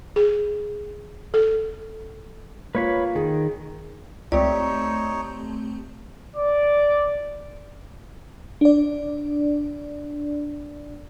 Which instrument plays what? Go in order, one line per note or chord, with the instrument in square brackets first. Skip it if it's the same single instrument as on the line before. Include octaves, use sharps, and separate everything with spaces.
[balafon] G#4
A4
[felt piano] A#3 F4 [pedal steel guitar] B4 C#5 B5
[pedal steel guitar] D#3 [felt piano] G#4
[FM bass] C#2 [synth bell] A3 C4 G4 [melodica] D#4 C#5 [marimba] D5
[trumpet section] D5
[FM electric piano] D4 D5